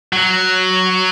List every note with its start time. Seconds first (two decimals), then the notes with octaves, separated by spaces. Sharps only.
0.13 F#3